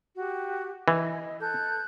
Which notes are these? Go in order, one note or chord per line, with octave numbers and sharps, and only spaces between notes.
F#4 G4
E3 D#5
A4 F#6 G6